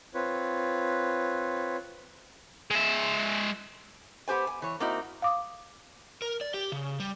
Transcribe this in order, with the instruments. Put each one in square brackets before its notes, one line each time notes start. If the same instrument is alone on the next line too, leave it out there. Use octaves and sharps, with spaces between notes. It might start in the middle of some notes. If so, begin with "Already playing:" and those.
[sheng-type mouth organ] C4 F4 B4 C#5
[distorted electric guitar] G#3 E5
[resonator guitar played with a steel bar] B3 G4 C5 G#5
G#5
E3 C#5
A#3 C4 D#4 E4 F#4
[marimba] F5 D6 D#6
[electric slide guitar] A#4
D5
G4
C#3
G3